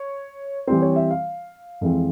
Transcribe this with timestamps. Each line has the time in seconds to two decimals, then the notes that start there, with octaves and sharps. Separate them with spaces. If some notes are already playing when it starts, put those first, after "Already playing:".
Already playing: C#5
0.67 E3 G3 C4 C5
0.82 C#5
0.96 E5
1.11 F5
1.81 F2 E3 G#3 C4